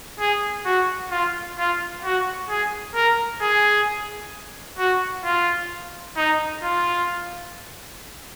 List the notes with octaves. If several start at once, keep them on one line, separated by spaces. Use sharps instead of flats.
G#4
F#4
F4
F4
F#4
G#4
A#4
G#4
F#4
F4
D#4
F4